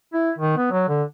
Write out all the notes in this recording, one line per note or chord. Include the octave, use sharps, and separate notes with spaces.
E4
D#3
B3
F#3
D3